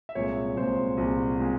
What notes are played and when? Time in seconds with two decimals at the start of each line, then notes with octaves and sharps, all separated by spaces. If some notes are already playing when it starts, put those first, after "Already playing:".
0.09 E5
0.15 C2 A#2 G#3 C#5
0.56 C2 A#2 G#3 C5
0.97 C2 A#2 G#3
1.40 A#2 G#3